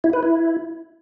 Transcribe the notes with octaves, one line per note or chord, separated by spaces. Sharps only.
E4
B4
E4